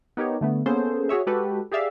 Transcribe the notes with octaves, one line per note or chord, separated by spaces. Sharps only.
B3 D#4 G4 A#4 C#5
D3 A3 B3
A#3 B3 C#4 G#4 A4 C5
F#4 G#4 C#5 E5
G#3 F#4 G4 A4 B4
G4 G#4 D5 E5 F5